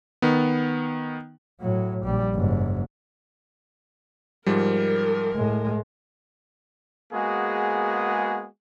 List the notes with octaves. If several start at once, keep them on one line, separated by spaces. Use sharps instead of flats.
D#3 B3
A2 F#3
A#1 G3
F#1 G#2
G#2 F3 G3 A#4
A2 G#3
G#3 A#3 B3 F#4 G#4